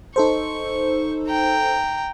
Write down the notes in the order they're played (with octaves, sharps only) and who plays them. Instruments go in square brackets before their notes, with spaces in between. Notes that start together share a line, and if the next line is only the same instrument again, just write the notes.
[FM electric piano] D#4 A4 C5 [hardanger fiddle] C#6
[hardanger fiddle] G5 A#5